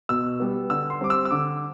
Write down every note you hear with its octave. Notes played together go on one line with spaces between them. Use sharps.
B2 E6
G3 B3
D3 E6
C6
G3 C4 D6
E6
E6
D3 D6